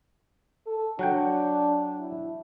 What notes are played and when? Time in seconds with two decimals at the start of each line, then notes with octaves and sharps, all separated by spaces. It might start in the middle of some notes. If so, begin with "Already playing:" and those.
0.67 A4
0.99 F#3 D4 F#5 G5
2.00 E4